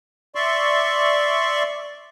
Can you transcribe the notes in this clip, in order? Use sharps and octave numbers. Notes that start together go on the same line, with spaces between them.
D5 E5 C6 C#6